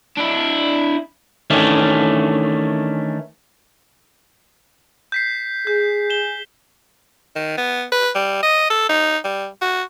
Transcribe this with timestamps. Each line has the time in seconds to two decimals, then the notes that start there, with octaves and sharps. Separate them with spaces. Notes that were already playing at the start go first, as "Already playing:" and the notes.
0.17 D4 E4
1.50 D#3 E3 A3 C#4 D4
5.12 G6 B6 C7
5.67 G#4 G6
6.10 E7 G7
7.36 D#3
7.58 B3
7.92 B4
8.15 G3
8.43 D#5
8.70 A4
8.89 D#4
9.24 G3
9.62 F#4